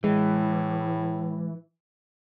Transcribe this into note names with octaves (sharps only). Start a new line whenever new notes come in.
A2 E3 G#3